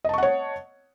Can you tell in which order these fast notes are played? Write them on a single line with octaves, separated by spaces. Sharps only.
D#5 A5 C#6 F#5 C#5